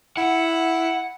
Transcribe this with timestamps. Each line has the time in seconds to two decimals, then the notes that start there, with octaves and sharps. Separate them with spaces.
0.17 E4 F#5